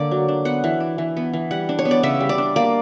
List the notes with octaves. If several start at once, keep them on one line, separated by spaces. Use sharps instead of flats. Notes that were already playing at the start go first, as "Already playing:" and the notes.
Already playing: D3 A#3 D4 D5
F#3
D4
B3 F#5
E3
D4
E3
B3
E3
G3 F#5
D4
C#5
B3
D5
C#3 E5
G3
D5
D4
A#3 D5